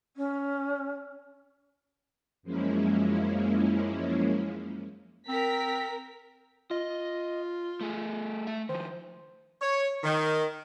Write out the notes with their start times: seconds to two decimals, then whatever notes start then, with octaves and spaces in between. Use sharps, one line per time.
0.16 C#4
2.43 F#2 F3 G#3 A#3 C#4 E4
5.29 C4 A#4 A#5 B6
6.71 F4 D#5
7.81 A3 G#4
8.47 A3 E5
8.69 D#3 F3 C5
9.61 C#5
10.04 D#3